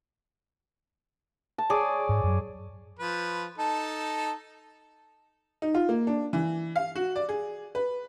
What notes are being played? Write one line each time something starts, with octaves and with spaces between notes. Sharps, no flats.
A5
G#4 C#5 D5
G#2
F#2 F#3
F3 B4
D#4 A4 A5
D#4
F4
A#3
D4
E3
F5
F#4
D5
G#4
B4